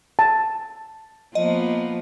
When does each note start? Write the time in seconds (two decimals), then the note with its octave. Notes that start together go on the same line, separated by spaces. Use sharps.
0.19 A5
1.35 F3 A#3 B3 D#5